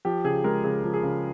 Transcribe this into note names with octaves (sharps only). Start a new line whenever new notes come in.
F3 G4
C#3 G#4
G#3 A#4
C#3 G#4
F3
G#4
C#3